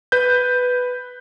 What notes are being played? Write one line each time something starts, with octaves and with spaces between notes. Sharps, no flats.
B4 G6